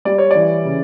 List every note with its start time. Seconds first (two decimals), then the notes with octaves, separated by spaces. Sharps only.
0.05 G3 D5
0.18 C#5
0.31 E3 D5
0.65 C#3